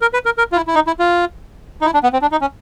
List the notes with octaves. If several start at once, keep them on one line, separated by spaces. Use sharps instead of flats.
A#4
B4
A#4
A#4
F4
E4
E4
D#4
E4
F4
D#4
E4
D4
B3
C4
D4
D#4
C#4